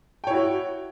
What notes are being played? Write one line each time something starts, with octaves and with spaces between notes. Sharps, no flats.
E4 F#4 C#5 G5